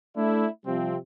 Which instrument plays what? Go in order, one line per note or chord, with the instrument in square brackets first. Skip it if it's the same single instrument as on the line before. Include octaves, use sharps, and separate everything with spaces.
[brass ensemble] A3 D4 E4
C3 F3 G3 C4